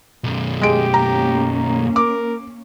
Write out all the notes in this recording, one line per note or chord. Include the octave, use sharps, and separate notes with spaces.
B1 F#2
G#3 G4 D7
A#3 C#4 A#5
A#4 D6